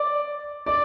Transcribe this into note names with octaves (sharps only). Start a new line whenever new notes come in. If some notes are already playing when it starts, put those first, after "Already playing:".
Already playing: D5
D5